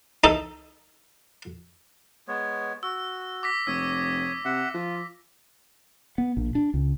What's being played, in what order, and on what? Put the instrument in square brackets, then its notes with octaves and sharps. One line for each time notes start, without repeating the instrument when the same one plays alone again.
[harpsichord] D#4 A4
[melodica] G#3 B3 C#5
[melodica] F#4 [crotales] E6
[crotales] D6 A#6 B6
[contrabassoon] F1 [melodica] C#5 D#6 [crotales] E6
[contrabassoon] C3 [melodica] E5 F#5
[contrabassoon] F3 [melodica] F4
[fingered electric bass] B3
A#1
D4
C#2